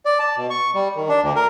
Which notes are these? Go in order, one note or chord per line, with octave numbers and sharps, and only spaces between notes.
D5
A5
B2
C#6
G3
D#3
D4
D2
A#4